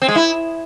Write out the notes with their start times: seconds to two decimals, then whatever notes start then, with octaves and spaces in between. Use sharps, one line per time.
0.02 C4
0.08 G#3
0.15 E4